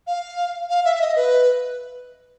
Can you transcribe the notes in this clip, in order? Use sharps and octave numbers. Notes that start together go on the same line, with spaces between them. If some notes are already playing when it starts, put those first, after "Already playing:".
F5
F5
E5
E5
D#5
B4